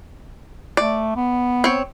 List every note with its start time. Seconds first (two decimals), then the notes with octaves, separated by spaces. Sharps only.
0.77 A3 D5
1.16 B3
1.64 C4 C#5